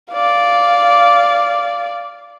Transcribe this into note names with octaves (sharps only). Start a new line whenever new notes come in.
D5 F5